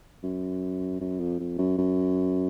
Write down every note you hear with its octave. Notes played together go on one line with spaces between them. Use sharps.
F#2
F#2
F2
F2
F#2
F#2